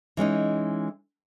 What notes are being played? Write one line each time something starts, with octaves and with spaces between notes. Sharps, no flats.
E3 G#3 C#4 D#4